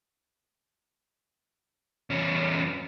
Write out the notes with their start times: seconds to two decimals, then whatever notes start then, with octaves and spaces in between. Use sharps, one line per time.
2.10 E2 C#4